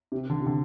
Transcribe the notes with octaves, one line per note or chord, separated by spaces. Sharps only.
C3
D3
C3
D3